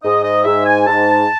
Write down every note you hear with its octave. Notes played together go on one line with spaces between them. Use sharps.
G#2 D#5
D#5
G#2 E5
G#5
G#2 A5